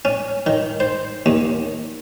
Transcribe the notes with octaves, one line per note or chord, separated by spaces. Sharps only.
C#4
D#3
C5
D#2